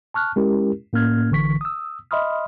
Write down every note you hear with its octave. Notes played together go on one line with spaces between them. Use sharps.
A5 C#6 F6 F#6
G#3 C#4 E4 G4 A#4
A2 A#3 C#4 F6 G#6
G#1 D3 E3 C#6 B6
D#6 E6
D#5 E5 B5 C6 D#6 F6